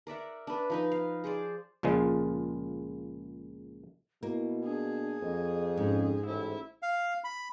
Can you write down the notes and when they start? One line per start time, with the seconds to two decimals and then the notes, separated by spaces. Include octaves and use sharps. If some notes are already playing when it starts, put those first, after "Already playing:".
0.07 A#4 D5 E5 F#5
0.47 D4 B4
0.70 F3 D#4 B4
0.92 F5
1.24 G#4 C5 D5
1.83 C#2 A#2 F3 G#3
4.23 B2 A#3 E4
4.65 D4 G#4
5.22 F2 D#5
5.77 G#2 C#4
6.26 A1 E4 C5
6.83 F5
7.24 B5